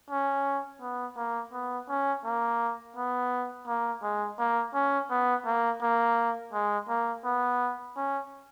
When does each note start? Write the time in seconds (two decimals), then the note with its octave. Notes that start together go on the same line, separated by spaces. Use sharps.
0.10 C#4
0.81 B3
1.17 A#3
1.53 B3
1.89 C#4
2.25 A#3
2.97 B3
3.67 A#3
4.03 G#3
4.39 A#3
4.74 C#4
5.11 B3
5.46 A#3
5.82 A#3
6.53 G#3
6.89 A#3
7.25 B3
7.97 C#4